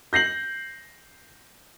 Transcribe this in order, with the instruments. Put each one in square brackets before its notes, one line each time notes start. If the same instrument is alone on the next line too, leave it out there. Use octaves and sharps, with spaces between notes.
[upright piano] G6 A#6 C7 F#7